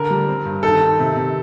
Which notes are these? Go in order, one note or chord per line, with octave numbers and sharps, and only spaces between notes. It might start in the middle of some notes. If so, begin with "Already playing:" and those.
Already playing: D3 A#4
G3
C4
G2
D#3 A4
D#3
C3
C3